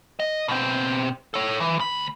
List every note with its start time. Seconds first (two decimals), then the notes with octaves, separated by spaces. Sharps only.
0.20 D#5
0.48 B2 C4
1.34 A4 C#5
1.60 E3
1.79 D2 B5